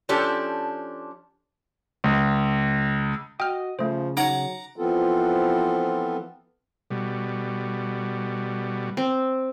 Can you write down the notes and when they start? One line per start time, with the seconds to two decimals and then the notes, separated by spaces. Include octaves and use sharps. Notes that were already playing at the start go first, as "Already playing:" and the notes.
0.09 F3 C#4 D4 G4 A4
2.04 C#2
3.40 F#4 D#5 G5 F6
3.79 C#3 F3 A3 C5
4.17 F#3 D#4 C#5 F#5 A#5 D6
4.76 E3 F3 B3 C4 F4 A4
6.91 B2 G3
8.97 C4